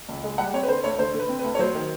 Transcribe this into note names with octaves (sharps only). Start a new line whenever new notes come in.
C#2
G#3
G3 F#5
C4 C#5
B4
D3 C5
D2 C#5
D3 C5
D3
B4
C4
B4
D2
C#5
F#3 C5
D#3